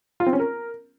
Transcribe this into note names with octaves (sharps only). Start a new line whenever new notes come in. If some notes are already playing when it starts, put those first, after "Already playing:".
F4
C4
C#4
A#4